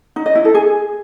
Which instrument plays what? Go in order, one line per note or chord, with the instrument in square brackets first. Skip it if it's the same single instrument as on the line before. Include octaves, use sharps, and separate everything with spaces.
[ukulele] D#4
D#5
E4
A4
G#4